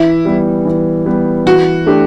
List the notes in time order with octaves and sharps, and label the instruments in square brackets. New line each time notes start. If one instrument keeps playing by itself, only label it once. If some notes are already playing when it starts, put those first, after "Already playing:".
Already playing: [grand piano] E3 [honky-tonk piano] E4
[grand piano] G3 B3
E3
G3 B3
[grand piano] E3 [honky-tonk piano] F#4
[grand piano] A3 D4 G4